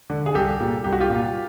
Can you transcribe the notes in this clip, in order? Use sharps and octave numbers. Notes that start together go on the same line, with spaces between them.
D3
G#4
C2 G4 A4
A#2
C2 G4
F#4
F4 G4
A#2